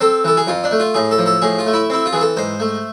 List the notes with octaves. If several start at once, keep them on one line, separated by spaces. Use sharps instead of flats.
C4 A4
E3 A4
G#4
F2 F4
D4
A3
F4
A2 G#4
A4
F3
A4
A2 G#4
F4
A3
E4
C4 E4
F4
E3 G#4
A4
G#2 C5
A3